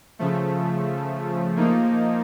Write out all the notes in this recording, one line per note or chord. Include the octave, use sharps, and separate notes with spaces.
C#3 F3 A3
F3 A#3 D#4